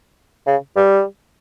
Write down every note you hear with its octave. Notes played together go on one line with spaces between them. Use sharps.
C#3
G3